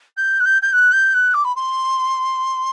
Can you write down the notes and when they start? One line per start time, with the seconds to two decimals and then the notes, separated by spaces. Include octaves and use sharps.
0.17 G6
0.39 F#6
0.45 G6
0.62 G6
0.72 F#6
0.92 G6
1.13 F#6
1.34 D6
1.44 B5
1.55 C6